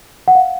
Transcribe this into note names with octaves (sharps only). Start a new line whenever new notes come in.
F#5
F5